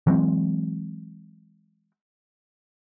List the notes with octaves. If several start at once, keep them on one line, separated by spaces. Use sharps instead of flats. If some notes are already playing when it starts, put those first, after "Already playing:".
E3 F#3 G#3 C4